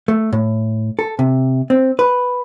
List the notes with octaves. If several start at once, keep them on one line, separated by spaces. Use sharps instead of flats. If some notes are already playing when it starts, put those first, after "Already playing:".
A3
A2
A4
C3
C4
B4